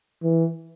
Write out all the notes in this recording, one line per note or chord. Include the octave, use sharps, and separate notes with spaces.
E3